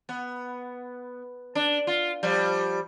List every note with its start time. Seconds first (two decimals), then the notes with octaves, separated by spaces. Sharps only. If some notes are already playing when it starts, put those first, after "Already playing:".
0.09 B3
1.55 D4
1.87 F4
2.23 F3 G3